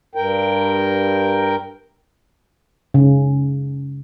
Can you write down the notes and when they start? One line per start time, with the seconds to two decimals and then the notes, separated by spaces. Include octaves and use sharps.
0.15 G2 A#4 G5
2.94 C#3